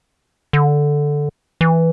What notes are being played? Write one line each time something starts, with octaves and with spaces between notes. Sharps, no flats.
D3
E3